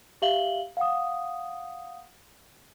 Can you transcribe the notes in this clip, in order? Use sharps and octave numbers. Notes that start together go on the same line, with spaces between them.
G4 E5 F5 F#7 G7
F5 F#5 D#6